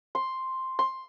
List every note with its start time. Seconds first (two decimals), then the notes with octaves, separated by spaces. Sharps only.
0.15 C6
0.79 C6